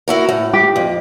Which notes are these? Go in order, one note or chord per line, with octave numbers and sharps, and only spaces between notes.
E4 F#4 A#4
A2
G4
F2